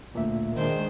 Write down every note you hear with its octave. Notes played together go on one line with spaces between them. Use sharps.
D2 A#2 E5
D#3 G#3 D4 C5